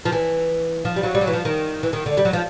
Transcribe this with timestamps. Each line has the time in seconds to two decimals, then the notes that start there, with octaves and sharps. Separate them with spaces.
0.05 F3
0.12 E3
0.85 F3
0.96 G3
1.03 F#3
1.15 G3
1.21 F#3
1.27 E3
1.33 F3
1.45 D#3
1.83 E3
1.93 D#3
2.06 D3
2.17 G3
2.25 F#3
2.33 F3